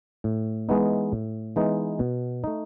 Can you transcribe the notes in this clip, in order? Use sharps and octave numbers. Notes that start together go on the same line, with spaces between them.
A2
E3 G#3 B3 D#4
A2
E3 G#3 B3 D#4
B2
A3 D#4